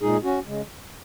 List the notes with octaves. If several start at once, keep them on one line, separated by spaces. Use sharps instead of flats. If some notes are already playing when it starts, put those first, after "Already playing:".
A#2 G#3 D#4 G#4
C#4 F#4
C#3 G#3